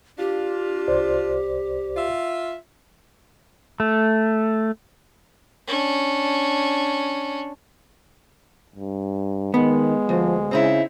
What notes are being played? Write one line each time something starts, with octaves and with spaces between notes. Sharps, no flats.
D4 F4 G4
C2 C5 D5
F4 E5
A3
C#4 D4
G2
D#3 G#3 B3
D2 F3
C#3 C4 D#4 E4